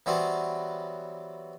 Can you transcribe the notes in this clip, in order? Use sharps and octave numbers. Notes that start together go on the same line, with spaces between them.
E3 F#3 G3 B3 C4